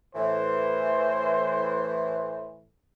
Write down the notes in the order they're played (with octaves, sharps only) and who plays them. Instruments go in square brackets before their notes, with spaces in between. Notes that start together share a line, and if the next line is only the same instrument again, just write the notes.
[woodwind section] A2 E3 [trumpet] C5